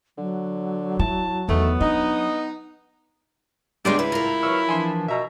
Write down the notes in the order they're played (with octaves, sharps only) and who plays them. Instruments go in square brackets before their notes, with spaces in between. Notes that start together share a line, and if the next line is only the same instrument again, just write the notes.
[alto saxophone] D3 [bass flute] F#3
[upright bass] E4 [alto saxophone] A5
[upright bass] E2 [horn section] D#3 A3 [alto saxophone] B3
[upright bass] D4 [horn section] D#4
[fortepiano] C#2 C6 D6 [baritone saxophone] G3 [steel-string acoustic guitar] G#3 B3 D4
[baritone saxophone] E4 [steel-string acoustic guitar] B4
[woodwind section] A2 A#5 [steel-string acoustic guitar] F4 A#4
[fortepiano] F#3 E6 [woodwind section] B4 C#6 F6
[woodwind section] E3 F3 D4 [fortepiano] G#5 C6
[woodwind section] B2 [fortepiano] E5 A#5